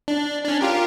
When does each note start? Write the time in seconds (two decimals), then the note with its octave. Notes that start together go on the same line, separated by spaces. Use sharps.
0.08 D4
0.45 C#4 D4
0.61 F4 G4 A#4